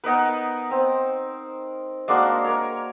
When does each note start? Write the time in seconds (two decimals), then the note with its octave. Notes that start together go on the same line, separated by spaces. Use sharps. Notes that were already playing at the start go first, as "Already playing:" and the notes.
0.04 B3 D#4 A#4 B4
0.71 C4
2.08 G#3 A#3 D4 F#4
2.44 A#4 C#5